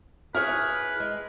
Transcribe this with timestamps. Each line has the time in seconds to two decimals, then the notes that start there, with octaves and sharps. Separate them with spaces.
0.35 E4 G#4 B4 C#5 F6
1.00 G#3